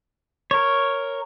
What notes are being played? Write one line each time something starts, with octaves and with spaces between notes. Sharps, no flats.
A#4 C#5